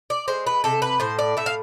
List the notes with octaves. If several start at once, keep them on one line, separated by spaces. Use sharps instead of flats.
D5
G#3 C5
B4
C3 A4
B4
A2 C5
D5
A2 E5
F5